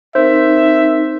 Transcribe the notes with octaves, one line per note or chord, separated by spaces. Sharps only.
C4 D#4 A#4 C5 E5